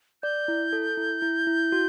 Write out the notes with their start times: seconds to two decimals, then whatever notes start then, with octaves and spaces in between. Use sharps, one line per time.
0.23 D5 G6
0.48 E4
0.73 A4
0.97 E4
1.22 E4
1.47 E4
1.72 F#4